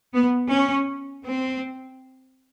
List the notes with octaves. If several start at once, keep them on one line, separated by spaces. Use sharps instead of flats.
B3
C#4
C4